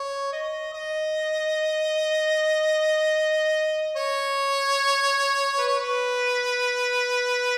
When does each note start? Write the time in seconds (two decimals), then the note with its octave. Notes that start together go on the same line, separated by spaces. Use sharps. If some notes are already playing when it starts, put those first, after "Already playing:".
Already playing: C#5
0.33 D#5
0.73 D#5
3.96 C#5
5.58 B4
5.68 C#5
5.77 B4